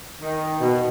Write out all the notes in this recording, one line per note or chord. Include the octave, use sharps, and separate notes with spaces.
D#3
B2